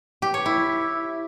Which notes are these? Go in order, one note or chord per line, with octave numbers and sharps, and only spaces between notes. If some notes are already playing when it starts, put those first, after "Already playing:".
G4
C#5
E4